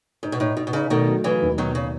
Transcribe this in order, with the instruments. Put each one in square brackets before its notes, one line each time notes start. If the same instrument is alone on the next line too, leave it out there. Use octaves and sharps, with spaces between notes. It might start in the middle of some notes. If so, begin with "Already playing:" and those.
[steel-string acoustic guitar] G#2 [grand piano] D#4
[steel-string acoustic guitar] B2
[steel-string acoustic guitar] A2 [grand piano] D#4
[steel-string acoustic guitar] B2 [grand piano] D#4
[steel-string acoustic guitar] B2
[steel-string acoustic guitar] C#3 [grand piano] D#4
[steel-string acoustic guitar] B2 D#3 [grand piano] A3
[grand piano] F#3
[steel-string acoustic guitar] C#3 E3 [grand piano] F#3
[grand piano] D#2
[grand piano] B2 [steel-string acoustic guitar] D#3 F#3
[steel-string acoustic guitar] C#3